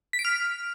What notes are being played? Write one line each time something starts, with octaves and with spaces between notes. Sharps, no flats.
B6
D7
F6